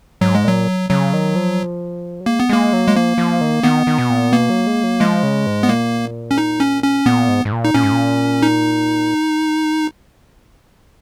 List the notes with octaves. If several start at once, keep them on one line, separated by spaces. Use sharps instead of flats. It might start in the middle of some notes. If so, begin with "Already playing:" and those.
G#2 F#3
G#3
A#2 F#3
C#3 F#3
D#3
F3
F#3
G#3 A#3
B3
G#3 A#3
F#3
G#3
F3 A#3
F3
D#3
D#3 B3
D#3
B2
A#2
B2 A#3
F#3
G#3
F#3
F3 G#3
C#3
G#2
B3
A#2 A#3
C#4
D#4
C#4
C#4
A#2 B3
G#2
G#2
A#2
D#4
A#2 C#4
G#2
A#2
D#4